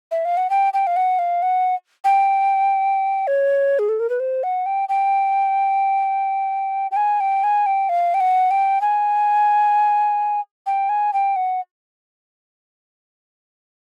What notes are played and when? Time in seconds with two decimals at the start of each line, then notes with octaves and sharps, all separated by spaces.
0.11 E5
0.25 F5
0.37 F#5
0.50 G5
0.73 G5
0.87 F5
0.96 F#5
1.19 F5
1.42 F#5
2.04 G5
3.27 C#5
3.79 G#4
3.89 A4
4.00 A#4
4.10 B4
4.20 C5
4.43 F#5
4.66 G5
4.89 G5
6.91 G5
6.96 G#5
7.20 G5
7.44 G#5
7.66 G5
7.89 F5
8.14 G5
8.20 F#5
8.51 G5
8.81 G#5
10.66 G5
10.89 G#5
11.13 G5
11.36 F#5